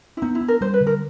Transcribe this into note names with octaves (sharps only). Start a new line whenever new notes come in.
E4
B3 D#4
E4
D4
A#4
G3 C5
B4
D3
A#4